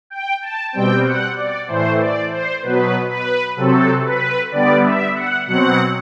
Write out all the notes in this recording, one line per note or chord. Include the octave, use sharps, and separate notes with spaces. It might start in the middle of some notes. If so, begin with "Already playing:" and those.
G5
A5
B2 G3 C4 G5
F#5
D5
A2 E3 A3 C5
D5
C5
B2 F#3 B3 B4
B4
C3 F#3 C4 A4
B4
D3 G3 B3 D5
E5
F#5
B2 F#3 C4 F#5